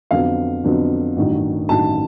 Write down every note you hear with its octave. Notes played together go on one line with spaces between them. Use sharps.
F2 D3 F#3 B3 F5
F2 D3 F#3 B3
A1 G2 D#3 F#3
A1 G2 D#3 F#3 A5